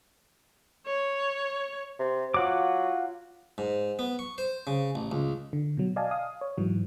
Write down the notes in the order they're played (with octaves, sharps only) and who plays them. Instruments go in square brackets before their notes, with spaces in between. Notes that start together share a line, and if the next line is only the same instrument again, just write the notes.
[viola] C#5
[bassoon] C3
[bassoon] F#3 [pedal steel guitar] F4 F#5 D6
[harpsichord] G#2
B3
C#6
C5
C#3
A1
C#2
[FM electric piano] D3
B2 F#3
D5 D#5 F5 G#5 A5
F5 D#6
C#5
G#2 E3 F#3